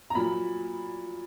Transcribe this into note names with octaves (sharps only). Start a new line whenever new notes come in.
A#5
A#2 F#3 A#3 B5